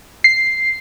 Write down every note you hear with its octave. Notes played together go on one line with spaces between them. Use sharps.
C7